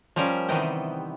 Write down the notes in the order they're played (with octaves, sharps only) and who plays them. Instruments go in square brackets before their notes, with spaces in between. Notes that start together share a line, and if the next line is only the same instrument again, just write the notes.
[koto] F3 G3 C#4 A#4
C3 D#3 E3 B3 D#5 G5